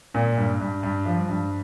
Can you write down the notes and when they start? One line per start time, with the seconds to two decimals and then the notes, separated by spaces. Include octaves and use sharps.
0.14 A#2
0.37 G2
0.60 G2
0.83 G2
1.06 F3
1.29 G2